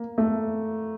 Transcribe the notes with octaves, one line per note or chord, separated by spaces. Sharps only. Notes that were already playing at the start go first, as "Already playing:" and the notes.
Already playing: A#3
A3